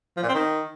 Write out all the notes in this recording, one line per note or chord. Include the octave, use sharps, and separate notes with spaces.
F3
A#2
C4
D#3